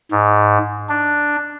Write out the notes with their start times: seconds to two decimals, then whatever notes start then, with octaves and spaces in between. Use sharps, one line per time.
0.11 G#2
0.89 D4